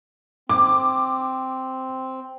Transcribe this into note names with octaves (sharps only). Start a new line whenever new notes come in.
C4 D6